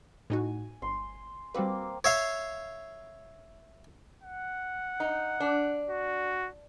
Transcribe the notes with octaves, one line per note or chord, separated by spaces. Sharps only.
A2 D#4 F#4 G#5
G1 C6
G3 A#3 C4 F#4 B4 D6
C#5 E5 F5
F#5
D#4
D4
F#4